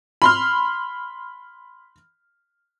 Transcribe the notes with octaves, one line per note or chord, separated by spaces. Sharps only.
B5 C6 F6